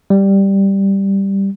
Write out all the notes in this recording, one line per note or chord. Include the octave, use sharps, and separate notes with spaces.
G3